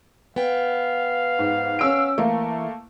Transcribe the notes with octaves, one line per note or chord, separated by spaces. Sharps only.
B3 F5 G5
G#2
C#4 E6 D7
E3 A3 A#3